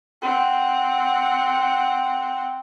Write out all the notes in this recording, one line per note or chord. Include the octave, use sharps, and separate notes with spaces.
C4 F#5